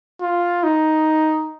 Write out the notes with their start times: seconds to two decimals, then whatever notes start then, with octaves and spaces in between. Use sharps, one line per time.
0.21 F4
0.64 D#4